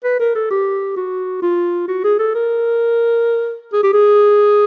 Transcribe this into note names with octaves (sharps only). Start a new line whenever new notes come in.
B4
A#4
A4
G4
F#4
F4
F#4
G#4
A4
A#4
G#4
G4
G#4